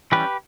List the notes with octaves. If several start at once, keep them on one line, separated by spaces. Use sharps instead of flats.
E3 G3 C#4 G4 B4